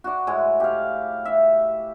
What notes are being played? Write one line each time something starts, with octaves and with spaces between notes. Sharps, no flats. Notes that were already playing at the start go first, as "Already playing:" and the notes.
F#4 D5
A2 G#3 G#5
G4 F5
E5